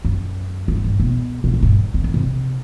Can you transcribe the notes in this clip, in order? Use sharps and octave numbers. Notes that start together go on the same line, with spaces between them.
F#2
G2
G2
B2
B2
A2
G2
C3
D#3
C3